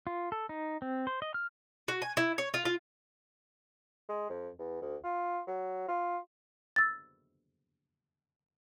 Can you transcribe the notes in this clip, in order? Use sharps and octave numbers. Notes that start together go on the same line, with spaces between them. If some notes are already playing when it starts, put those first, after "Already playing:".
F4
A4
D#4
C4
C5
D#5
F6
F#4
G#5
E4
C#5
F4
F4
G#3
F2
E2
D2
F4
F#3
F4
E6 A6